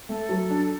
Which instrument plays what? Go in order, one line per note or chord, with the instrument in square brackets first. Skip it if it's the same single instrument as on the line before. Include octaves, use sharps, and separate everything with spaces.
[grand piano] A3 [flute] A4
[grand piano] F#3
D4